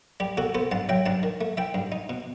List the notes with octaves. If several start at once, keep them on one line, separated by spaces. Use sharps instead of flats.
G3 G4
B2 F#4 A4
B3 A4 C5
G2 F#5 A5
F#3 E5 G5
G2 F#5 A5
D#3
A3
E3 E5 G5
G2
D#4
B2